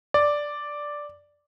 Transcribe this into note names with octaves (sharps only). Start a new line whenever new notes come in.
D5